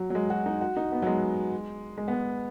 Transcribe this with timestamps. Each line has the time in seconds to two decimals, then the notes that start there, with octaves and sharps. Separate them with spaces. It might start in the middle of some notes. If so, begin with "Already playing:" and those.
Already playing: F#3
0.10 F#3
0.15 G#3
0.30 F#4
0.46 D#4
0.61 F#4
0.77 D#4
0.92 B3
1.02 F#3
1.07 G#3
1.98 G#3
2.08 B3
2.14 G#3